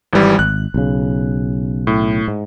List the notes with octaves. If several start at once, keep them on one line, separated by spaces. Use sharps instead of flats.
G#1 E3 G3
G#1 F#6
B1 C#3
A2
G#2